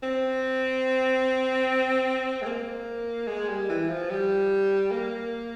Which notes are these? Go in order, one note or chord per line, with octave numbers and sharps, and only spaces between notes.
C4
G#3
A#3
G#3
G3
E3
F3
G3
A#3